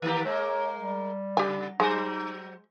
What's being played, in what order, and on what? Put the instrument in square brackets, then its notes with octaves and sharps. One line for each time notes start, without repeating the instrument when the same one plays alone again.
[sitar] D#3 A#3 G4 [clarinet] B4
[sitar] G#3 A#3 [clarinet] C#5
[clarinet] G3
[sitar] C#3 [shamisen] G4 G#5
[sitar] F#3 C5 [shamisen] G#3 [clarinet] D#4